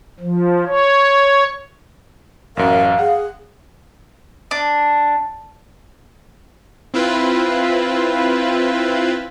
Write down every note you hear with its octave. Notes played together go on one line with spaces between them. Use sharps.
F3
C#5
A1 F#2 A#4 F5
G#4 F#5
D4
C4 E4 F4 B4